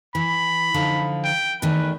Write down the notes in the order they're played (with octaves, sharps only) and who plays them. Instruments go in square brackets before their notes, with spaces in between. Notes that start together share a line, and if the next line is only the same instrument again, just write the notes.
[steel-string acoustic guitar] E3 [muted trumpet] B5
[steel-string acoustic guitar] D3 F3 D#4
[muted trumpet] G5
[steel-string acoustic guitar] E2 D#3 A3 [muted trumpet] B4